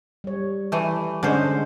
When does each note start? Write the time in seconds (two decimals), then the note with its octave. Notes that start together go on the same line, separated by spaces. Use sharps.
0.24 G3 C#5
0.72 E3 A3
1.23 D3 G#3 C#4 A4 C5 D#5